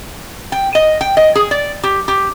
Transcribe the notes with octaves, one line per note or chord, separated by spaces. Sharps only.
G5
D#5
G5
D#5
G#4
D5
G4
G4